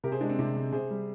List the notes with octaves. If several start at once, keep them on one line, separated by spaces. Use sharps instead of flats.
C3 G4 A#4
G#4 C5
G#3 D4
C4
C3 D4
C3
C3 G#4 C5
G3